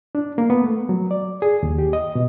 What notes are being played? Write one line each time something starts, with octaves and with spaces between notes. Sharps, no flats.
D4
A#3
B3
A3
F#3
D5
G#4
D#2
G4
D#5
B2